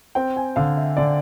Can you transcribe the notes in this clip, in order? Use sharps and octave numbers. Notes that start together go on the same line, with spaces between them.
C4 G5
G#5
D3 F5
E5
D3 D5